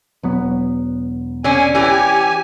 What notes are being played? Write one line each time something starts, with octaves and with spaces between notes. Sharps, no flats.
E1 F#3 B3
D3 C#4 G#5
E3 C#4 G4 G#5